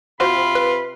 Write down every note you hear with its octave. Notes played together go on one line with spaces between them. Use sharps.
C3 F4 F#4 C5 B5
B4